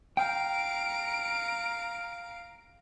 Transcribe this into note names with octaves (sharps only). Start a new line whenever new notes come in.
F5 G5 A#5 D7